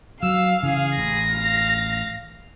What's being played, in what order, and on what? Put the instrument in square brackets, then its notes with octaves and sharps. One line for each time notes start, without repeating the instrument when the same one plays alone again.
[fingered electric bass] F#3 [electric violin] F5 [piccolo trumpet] E6
[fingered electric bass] C#3 E3 [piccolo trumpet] G#4
[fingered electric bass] A1 [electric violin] A#6
[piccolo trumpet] F5